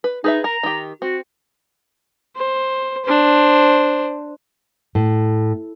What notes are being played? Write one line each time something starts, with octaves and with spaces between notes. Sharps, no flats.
B4
D#4 G#4 B4 E5
A#4 A#5
D#3 G4
C4 F#4
C5
D4 C5
A2